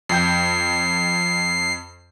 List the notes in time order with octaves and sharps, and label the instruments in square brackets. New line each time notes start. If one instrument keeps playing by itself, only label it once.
[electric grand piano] F2 G5 G6 [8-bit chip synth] C7